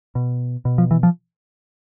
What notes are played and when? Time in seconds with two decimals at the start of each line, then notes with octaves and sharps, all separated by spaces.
0.15 B2
0.65 B2
0.78 F3
0.91 E3
1.03 F3